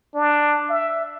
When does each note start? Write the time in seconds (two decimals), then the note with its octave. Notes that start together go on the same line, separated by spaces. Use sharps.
0.15 D4
0.70 E5